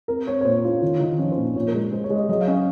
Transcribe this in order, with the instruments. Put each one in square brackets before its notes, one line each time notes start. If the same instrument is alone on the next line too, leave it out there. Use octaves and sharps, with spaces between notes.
[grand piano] C4 [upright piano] A#4
[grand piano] C4 [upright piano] C#5
[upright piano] C#5
[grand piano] A#2 [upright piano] C5
[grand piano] C#4 [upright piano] F4
[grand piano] D#3 [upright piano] F4
[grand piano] D#3 [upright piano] D#4
[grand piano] F3 [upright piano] C#4
[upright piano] C5
[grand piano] A#2
[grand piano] A#2 [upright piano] C#5
[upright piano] A#4
[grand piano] G#3
[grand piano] G#3 [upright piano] C5
[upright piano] C#5
[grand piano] G#3
[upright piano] D#5
[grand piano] F#3 [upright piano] D#5
[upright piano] F5
[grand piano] C#4
[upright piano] D#5